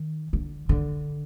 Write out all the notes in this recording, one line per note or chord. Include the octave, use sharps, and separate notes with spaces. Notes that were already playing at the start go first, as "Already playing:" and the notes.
Already playing: D#3
D3
D3